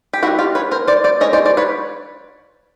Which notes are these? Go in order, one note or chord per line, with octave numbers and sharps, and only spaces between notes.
G4
G3 C4 D#4 E4 F#4
F4 G4
B4 C#5
A#4 C5
C5 D5
C5 D5
G#3 C#4 C#5 D#5
C5 D5
C5 D5
B4 C#5